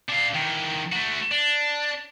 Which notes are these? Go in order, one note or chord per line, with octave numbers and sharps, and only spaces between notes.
D4 F5
E2 D#3
A3 F#4
D4